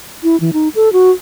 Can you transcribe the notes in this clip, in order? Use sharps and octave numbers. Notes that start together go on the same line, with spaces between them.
E4
E3
D#4
A4
F#4